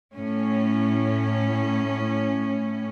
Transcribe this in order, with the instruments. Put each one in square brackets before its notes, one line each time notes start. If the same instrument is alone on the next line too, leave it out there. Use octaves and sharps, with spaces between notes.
[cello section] A2 C#4